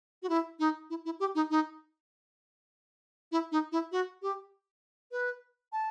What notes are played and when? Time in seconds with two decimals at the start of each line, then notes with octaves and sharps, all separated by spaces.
0.23 F#4
0.29 E4
0.59 D#4
0.90 E4
1.05 E4
1.20 G4
1.35 D#4
1.50 D#4
3.32 E4
3.51 D#4
3.72 E4
3.92 F#4
4.22 G4
5.11 B4
5.72 A5